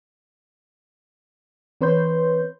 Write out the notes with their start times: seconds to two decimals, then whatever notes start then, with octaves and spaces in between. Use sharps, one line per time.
1.81 E3 C4 B4 C#5 C6 G6